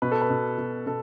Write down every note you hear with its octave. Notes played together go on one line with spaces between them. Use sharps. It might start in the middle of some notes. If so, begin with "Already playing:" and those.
B2 B4
A4
B4
B2
B2
B2 A4